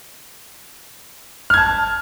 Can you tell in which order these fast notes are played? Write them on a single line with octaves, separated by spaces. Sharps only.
F6 G#6 A5